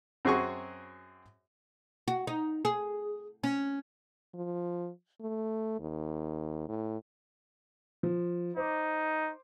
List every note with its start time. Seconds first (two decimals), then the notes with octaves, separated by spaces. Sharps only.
0.25 F#2 C4 F#4 G#4 G#5 C#6
2.08 F#4
2.27 D#4
2.65 G#4
3.44 C#4
4.34 F3
5.21 A3
5.80 D#2
6.69 A2
8.03 F3
8.57 D#4 C5 D6